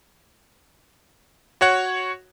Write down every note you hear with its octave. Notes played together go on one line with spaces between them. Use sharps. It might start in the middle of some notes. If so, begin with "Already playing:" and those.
F#4 C#5 F#5